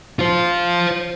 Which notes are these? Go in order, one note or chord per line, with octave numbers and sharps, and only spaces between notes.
F4 C5